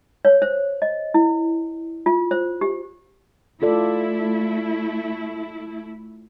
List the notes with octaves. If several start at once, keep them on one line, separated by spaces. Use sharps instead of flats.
C#5
C5
D#5
E4
F4
C5
G4
A3 E4 F4 A4 D5